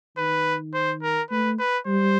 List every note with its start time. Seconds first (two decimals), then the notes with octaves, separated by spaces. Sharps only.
0.17 D#3 B4
0.74 C5
1.03 A#4
1.31 A3 B4
1.59 B4
1.87 G3 C5